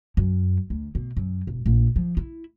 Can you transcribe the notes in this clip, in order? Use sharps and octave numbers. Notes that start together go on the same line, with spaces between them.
F#2
D2
B2
F#2
E1
A#1
F3
E4